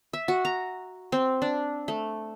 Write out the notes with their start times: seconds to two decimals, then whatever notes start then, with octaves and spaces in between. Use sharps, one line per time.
0.13 E5
0.28 F#4
0.45 A#5
1.12 C4
1.42 D4
1.88 A3